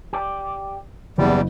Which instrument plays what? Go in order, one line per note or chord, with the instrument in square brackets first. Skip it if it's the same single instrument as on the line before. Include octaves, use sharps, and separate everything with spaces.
[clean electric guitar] G4 D5
[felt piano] F#1 [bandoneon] E2 G3 [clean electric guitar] B3